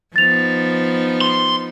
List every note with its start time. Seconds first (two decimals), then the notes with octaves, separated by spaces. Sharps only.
0.16 F3 B3 D#4 A6 F7
1.21 C6